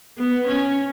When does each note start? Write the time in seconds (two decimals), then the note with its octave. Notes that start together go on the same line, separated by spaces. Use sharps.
0.18 B3
0.47 C#4